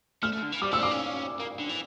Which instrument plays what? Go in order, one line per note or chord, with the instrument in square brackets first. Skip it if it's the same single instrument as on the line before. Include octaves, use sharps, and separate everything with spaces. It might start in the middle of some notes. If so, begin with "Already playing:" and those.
[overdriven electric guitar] A3 [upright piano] F6
[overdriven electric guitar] A3
D3
E3
[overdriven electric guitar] G3 [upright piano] D6
[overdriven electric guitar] A3 [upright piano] E6
[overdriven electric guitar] A#3 [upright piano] D6
[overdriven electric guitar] C#4
A#3
D3
E3